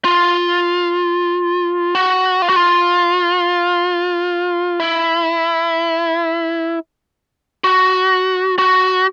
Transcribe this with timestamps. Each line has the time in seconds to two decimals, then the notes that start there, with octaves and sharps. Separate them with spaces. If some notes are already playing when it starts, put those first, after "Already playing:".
0.05 F4
1.95 F#4
2.42 F4
2.50 F#4
2.56 F4
4.80 E4
7.64 F#4
8.59 F#4